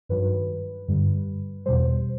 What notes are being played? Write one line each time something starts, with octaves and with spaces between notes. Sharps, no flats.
G2 D#3 F#3 B4
G2 D3 G3
E2 B2 G3 C5